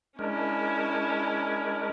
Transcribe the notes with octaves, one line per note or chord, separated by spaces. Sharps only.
G#3 C#4 D4 E4 A#4